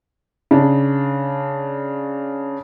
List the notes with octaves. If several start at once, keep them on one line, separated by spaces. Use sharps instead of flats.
C#3 D4